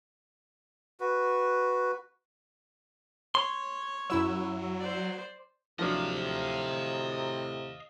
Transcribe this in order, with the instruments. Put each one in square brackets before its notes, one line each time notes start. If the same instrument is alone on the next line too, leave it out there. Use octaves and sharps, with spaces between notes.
[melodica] F#4 B4
[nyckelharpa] C#5 [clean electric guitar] C6
[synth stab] F#2 E4 E6 [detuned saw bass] F#3
[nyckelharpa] C5 D5
[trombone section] A2 C3 [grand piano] F3 F#3 D4 [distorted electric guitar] D#5 F5